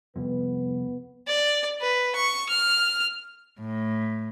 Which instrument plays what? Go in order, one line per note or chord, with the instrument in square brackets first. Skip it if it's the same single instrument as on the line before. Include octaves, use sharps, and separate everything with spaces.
[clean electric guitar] C2 F2 [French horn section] B3
[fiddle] D5
B4
C#6
F6
[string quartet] A2